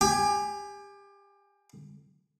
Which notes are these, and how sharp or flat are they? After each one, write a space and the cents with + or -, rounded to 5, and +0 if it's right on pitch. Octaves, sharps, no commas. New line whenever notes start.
G4 +25 G#5 +0